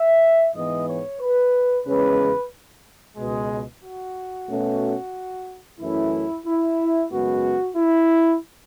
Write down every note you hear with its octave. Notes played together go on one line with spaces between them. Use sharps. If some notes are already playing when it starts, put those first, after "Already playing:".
Already playing: E5
G#2 E3 B3 D#5
C#5
B4
E2 C#3 G#3 C#4 B4
C#2 B2 G#3
F#4
B2 A3 C#4
F#2 E3 A3 C#4 E4
E4
F#2 C#3 G#3 B3 F#4
E4